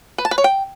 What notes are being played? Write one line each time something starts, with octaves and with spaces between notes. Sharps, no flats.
B4
A5
B4
C#5
G5